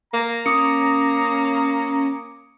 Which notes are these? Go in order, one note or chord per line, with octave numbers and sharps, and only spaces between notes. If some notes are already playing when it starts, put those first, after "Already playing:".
A#3 A#5
A#3 C#4 D6 D#6 C#7